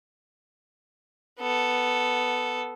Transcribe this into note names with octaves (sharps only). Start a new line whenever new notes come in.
B3 A4